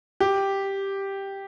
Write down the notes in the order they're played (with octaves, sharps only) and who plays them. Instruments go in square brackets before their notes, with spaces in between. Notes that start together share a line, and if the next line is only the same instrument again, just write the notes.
[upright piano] G4